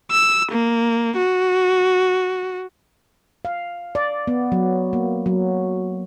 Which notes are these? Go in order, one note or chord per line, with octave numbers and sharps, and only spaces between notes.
E6
A#3
F#4
F5
D5
B3
F#3
A#3
F#3